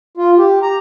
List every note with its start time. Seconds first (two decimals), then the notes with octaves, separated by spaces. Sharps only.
0.17 F4
0.37 G4
0.62 A#5